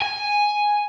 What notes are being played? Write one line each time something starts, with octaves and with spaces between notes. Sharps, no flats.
G#5